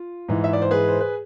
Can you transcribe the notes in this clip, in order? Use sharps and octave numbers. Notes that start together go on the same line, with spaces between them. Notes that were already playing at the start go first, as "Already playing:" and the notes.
Already playing: F4
G#2 E3
E5
D5
C5
G#4 B4
C5
B4